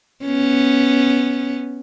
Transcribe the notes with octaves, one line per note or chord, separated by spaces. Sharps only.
B3 C#4